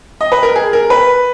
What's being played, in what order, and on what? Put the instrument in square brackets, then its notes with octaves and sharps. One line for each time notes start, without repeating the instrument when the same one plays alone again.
[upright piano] D#5
B4
A#4
G#4
A#4
B4